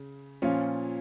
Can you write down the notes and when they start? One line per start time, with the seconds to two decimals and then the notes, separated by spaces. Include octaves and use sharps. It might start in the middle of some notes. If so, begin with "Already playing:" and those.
Already playing: C#3
0.42 A#2 F3 C#4 F4